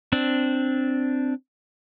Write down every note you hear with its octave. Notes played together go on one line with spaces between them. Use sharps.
C4 D4